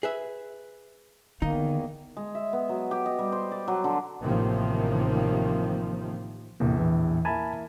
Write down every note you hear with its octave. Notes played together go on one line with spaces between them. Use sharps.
G#4 B4 E5
E2 D3 D#3 A#3 D#4
G#3
E5
B3
F#3
G4
D#5
G3
C5
D5
F#3
D3
A1 C3 D#3 F3 A#3
A#1 E2 A2 C3 A#3
E3
A#3 E4 G#5 A5 B5